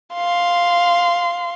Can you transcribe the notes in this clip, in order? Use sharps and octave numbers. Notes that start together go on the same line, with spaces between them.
F5 C6